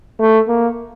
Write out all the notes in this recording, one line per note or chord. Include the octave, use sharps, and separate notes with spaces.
A3
A#3